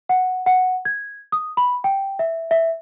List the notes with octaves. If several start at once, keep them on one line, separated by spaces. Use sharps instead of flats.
F#5
F#5
G#6
D#6
B5
G5
E5
E5